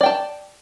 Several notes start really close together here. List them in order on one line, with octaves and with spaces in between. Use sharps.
D5 G5 A5